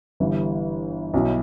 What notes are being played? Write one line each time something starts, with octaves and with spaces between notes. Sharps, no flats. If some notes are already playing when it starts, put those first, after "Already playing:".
G1 G2 E3
B1 B2 F#3 B3 E4